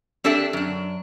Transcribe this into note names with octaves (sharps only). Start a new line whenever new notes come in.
C4 D4 G4 A4 D5 E5
F#2 D4